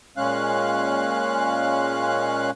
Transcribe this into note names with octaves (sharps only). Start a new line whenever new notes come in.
A#2 G#3 C#4 F5 F#6